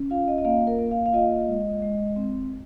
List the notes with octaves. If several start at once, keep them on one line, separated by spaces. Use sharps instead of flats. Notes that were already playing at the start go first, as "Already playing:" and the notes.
Already playing: C#4
F4 F5
D#5
D#5
A#3 F5
A#4
A#3
F5
F5
F4 D#5
G#3
G#3
C4